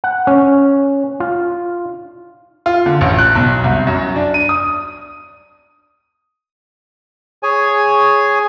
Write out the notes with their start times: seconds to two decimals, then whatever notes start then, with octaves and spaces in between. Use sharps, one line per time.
0.04 F#5
0.27 C#4
1.20 F4
2.66 F4
2.86 D3
3.01 A1
3.19 F#6
3.35 B1
3.64 C2
3.87 F#2
4.16 D4
4.34 D#7
4.49 D#6
7.43 G#4 C#5 G#5